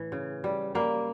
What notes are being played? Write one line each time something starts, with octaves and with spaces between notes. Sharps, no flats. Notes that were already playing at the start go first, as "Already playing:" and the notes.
Already playing: A2 E3
C#3
G3
G3 A#3